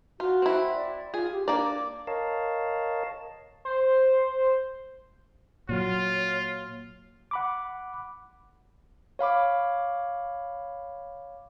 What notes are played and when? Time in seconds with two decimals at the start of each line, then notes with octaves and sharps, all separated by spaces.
0.20 F4 F#4
0.42 C4 E4
0.75 D5
1.14 F4 G#4
1.32 G4
1.48 A#3 D4 D5
2.07 A#4 C#5 D#5 F5 A5
3.65 C5
5.69 A#2 F#3 F4 C#5
7.31 F#5 B5 D6
9.19 C#5 F5 B5 D6